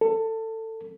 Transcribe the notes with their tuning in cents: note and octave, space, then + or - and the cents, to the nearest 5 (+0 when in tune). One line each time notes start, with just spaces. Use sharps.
A4 +20